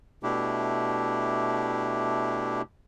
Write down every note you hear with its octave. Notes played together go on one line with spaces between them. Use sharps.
B2 A3 D4 E4 G4